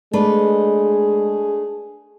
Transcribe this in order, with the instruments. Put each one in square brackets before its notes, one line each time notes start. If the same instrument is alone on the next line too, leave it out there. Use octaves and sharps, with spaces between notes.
[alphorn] G#3 [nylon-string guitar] A3 D4 B4 [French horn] G#4